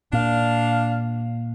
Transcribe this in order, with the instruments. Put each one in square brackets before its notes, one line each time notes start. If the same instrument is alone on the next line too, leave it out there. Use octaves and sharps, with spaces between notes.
[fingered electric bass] A#2 [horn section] D4 F5